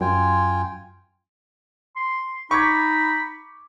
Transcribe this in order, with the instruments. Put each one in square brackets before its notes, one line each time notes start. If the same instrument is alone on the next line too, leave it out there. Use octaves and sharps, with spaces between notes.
[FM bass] F#2 [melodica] F4 G5 G#5
[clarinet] C6
[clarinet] D#4 [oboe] B5 [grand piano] C#6 D6 G#6